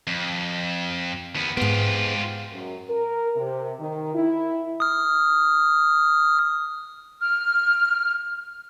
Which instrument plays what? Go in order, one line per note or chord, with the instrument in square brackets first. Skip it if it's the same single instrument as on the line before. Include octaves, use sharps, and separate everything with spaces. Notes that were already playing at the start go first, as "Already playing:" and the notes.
[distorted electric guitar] F2
D#2 B3
[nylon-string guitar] G#2 B3 [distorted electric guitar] F4 G4
[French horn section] F#2
A#4
C3
D#3
E4
[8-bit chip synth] D#6 F6
[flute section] F6